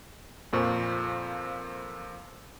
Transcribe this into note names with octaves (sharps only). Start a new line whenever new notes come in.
F2 A#2 F3 C#6